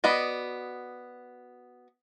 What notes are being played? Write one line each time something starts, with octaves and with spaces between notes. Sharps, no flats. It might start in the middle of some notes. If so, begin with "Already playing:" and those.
B3 F#4 D5 D#5